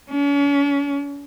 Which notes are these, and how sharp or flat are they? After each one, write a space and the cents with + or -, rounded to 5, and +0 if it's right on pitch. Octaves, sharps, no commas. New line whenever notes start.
C#4 +40